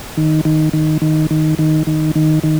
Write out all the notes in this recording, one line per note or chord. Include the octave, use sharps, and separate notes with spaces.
D#3
D#3
D#3
D#3
D#3
D#3
D#3
D#3
D#3